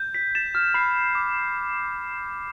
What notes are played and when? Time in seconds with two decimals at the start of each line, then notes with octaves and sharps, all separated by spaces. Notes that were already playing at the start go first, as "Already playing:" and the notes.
Already playing: G6
0.14 B6
0.35 A6 E7
0.55 F6
0.74 B5 C7
1.15 D6